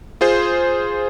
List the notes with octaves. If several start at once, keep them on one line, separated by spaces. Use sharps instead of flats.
F4 G#4 C5